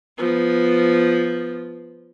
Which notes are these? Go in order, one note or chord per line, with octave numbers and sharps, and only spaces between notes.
F3 B3